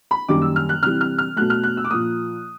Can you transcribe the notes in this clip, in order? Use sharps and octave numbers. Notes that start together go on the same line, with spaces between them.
B5
F#2 D#3 G3 A#3 D6
E6
F6
F#6
C3 E3 G3 F6
F6
F6
B2 F#3 A3 F#6
F6
F#6
E6
D6
A#2 F3 A#3 D#6